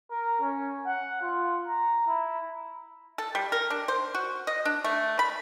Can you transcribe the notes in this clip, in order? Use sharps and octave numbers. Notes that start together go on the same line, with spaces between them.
A#4
C#4
F#5
F4
A#5
E4
A4
G3
A#4
D4
C5
F#4
D#5
D4
A3
B5